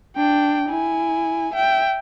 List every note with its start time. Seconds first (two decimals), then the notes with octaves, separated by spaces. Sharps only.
0.16 D4 G5
0.69 E4 G#5
1.54 E5 G5